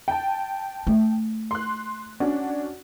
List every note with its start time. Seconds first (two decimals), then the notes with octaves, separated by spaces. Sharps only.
0.08 G5 A5
0.87 A3
1.51 C6 F#6
2.20 C#4 D4 F#4